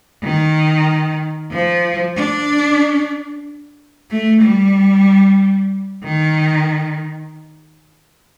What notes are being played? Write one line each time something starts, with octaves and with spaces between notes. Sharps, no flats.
D#3
F3
D4
A3
G3
D#3